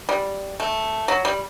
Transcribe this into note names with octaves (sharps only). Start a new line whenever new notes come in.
G3
A3
F#3
G3